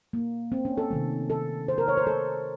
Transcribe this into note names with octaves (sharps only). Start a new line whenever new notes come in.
A#3
C4
C#4
A4
C3 D#3 A3
A4
C5
A#4
C#5
C5
A4